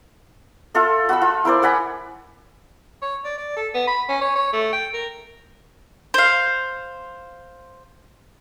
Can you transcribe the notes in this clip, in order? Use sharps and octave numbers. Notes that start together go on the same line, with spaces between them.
F4 A4 E5
F#4 B5 E6
F4
E4 A#4 C5 D5
D5 F#5 G#5 B5
C#5
D5
D5
A4
B3
B5
C#4
C#5
C#5
A3
G5
A#4
C5 F5